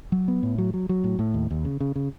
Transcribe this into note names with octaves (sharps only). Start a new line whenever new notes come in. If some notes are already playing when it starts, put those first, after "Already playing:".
F#3
B3
A2
F#3
F#3
F#3
A2
A2
D#2
D#2
C#3
C#3
C#3